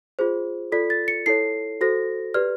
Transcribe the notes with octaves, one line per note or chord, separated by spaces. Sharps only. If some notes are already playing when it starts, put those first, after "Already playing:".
F4 G#4 C5
F4 A4 D5 B6
A6
C#7
E4 A4 C#5 C7
F#4 A4 C5 A#6
G4 B4 D5 F6